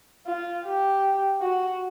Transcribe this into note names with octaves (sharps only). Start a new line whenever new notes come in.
F4
G4
F#4